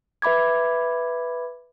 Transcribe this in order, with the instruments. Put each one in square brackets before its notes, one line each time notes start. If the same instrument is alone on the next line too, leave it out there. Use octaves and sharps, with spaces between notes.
[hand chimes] B4 E5 B5 D6 G#6